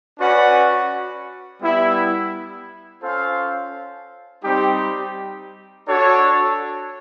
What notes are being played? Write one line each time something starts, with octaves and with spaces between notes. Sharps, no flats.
C#4 F#4 B4 D5 F#5
G3 B3 E4
C#4 F4 A4 C5 F5
G3 C4 D#4 G4
D4 F#4 A4 C#5